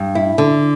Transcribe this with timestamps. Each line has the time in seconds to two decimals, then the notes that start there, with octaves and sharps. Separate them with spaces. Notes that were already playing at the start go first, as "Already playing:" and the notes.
Already playing: G2
0.15 E4
0.38 D3